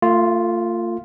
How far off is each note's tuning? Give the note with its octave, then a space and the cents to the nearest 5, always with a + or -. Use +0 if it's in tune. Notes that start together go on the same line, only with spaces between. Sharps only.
A3 +40 F4 +0